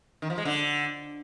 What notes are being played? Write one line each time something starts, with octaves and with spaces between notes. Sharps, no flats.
D#3
F3
G#3
D3